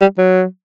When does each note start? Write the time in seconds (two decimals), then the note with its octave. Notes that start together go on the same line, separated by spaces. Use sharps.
0.01 G3
0.18 F#3